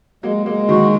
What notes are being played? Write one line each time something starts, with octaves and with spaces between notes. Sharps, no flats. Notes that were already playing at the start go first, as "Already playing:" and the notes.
F#3 G#3 A#3
F#3 G#3 A#3
D#3 F#3 F#4